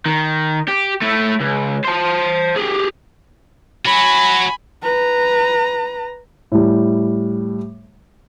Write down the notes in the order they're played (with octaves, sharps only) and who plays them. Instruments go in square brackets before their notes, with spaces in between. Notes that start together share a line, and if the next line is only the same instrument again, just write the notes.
[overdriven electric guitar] D#3
G4
A3 E4
C#2
C5 A5
G4 G#4
[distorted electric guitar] F#4 C#5 [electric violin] G#5 B5
[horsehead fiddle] B4 A#5
[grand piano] A2 G3